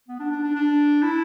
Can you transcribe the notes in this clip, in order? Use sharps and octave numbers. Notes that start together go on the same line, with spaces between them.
B3
D4
D4
D4
D4
E4